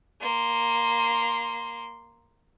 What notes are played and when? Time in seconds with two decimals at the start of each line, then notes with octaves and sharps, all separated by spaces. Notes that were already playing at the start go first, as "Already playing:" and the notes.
0.20 A#3 C6